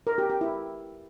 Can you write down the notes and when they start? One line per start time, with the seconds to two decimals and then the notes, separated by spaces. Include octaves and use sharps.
0.07 A#4
0.18 G4
0.30 G4
0.41 E4